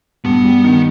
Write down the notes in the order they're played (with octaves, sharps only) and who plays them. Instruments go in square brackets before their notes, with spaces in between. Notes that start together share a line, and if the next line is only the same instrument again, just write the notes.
[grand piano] G2 [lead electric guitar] B3
[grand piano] G3
D#3